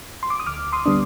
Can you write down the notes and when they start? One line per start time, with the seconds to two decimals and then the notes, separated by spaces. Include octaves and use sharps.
0.23 C6
0.30 D6
0.40 D#6
0.46 D2 D6 F6
0.72 C6 D#6
0.86 D3 G3 B3 D4